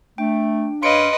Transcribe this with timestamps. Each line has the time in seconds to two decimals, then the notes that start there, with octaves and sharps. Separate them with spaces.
0.18 A3 D4 G5
0.83 F#2 B4 C#5 D#5 F5 C6 C#7 D7